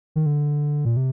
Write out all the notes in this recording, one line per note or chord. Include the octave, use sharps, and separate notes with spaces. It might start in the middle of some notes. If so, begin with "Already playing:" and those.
D#3
D3
A#2
C3